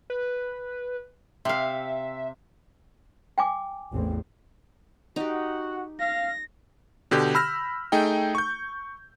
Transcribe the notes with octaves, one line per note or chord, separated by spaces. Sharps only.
B4
C3 E5 F5
G5 G#5 D6
A1 E2 C4
D#4 F#4 G4 F#5
F5 A#6
B2 D3 G4 G6
B5 E6 F6 A#6
A3 D#4 G#4 G5
C#6 G6